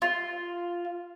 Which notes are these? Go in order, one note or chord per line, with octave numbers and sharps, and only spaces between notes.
F4